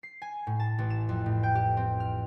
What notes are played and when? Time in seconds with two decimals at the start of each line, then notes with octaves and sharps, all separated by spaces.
0.03 C7
0.22 G#5
0.47 A2
0.60 A5
0.78 A1
0.90 E7
1.09 F2
1.26 A2
1.43 G5
1.55 G4
1.77 C4
2.00 F6